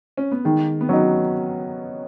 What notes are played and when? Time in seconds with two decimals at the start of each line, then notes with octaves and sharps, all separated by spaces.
0.17 C#4
0.31 B3
0.44 D#3 G#3
0.81 B3
0.89 F#3 C#4 D#4